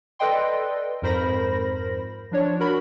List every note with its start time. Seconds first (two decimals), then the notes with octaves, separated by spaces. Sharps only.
0.19 A4 B4 D5 D#5 G5 C6
1.02 F2 G#2 A#4 C5 B5 A#6
2.31 F3 D4 C#5
2.59 F#4 A#4 B5